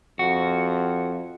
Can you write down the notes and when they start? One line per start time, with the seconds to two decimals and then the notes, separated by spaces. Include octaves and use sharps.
0.19 F2 F#4